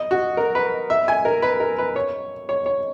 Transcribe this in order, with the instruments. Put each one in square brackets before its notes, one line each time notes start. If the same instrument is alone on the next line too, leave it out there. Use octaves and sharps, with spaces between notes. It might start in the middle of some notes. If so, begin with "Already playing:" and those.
Already playing: [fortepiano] D#5
F#4
A#4
B4
E5
G#5
A#4
B4
A#4
B4
C#5
C#5
C#5